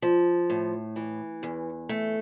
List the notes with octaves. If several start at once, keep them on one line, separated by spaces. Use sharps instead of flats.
F3
A2
E3
E2
A3